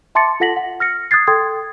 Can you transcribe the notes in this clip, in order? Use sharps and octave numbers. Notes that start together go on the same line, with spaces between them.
E5 A5 C6 D6 A6 C#7
F4 A4 F#5 A#6 B6 F#7
F#5
F6 A#6 C#7
D#6 F#6 G#6 A6 C7
A4 G5 C6 D#6 G#6